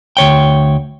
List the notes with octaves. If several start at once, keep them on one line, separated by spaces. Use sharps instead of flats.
D2 C#5 G5